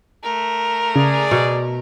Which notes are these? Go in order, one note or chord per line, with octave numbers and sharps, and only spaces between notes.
A3 A#4
C#3 G#4 D5
B2